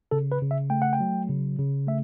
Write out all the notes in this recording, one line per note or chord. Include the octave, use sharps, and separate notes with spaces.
C#3 A4
B4
C#3
E5
A3 G5
F#5
G5
F#3
C#3
C#3
A3 E5